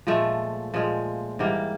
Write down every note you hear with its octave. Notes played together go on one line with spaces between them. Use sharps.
A#2 F3 G#3 A3
A#2 F3 G#3
G#2 E3 G3 A#3